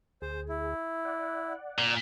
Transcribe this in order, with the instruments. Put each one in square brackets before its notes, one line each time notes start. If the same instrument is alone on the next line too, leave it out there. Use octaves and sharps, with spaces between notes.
[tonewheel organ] D2 G#4 [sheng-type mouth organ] C5
[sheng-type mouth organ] E4
[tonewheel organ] D5 F#5
[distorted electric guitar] A#2